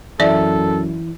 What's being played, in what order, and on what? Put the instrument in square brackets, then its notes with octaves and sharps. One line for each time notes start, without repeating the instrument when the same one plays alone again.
[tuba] F#2 [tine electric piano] E3 E4 [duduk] A4 [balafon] D5 E5